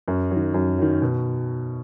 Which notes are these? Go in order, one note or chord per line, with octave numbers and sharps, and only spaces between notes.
F#2
D#3 F#3
F#2
D#3 F#3
B2